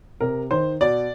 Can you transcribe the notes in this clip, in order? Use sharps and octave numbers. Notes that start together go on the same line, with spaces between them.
C3 A#4
D#3 C5
B2 D5